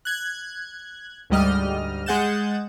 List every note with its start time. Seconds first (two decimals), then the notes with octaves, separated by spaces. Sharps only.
0.05 F#6 G#6
1.30 D2 G#2 G3 D#5 F6
2.06 G#3 G#4 F#5 G6 A6 E7